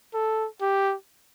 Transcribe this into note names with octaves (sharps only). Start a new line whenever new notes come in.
A4
G4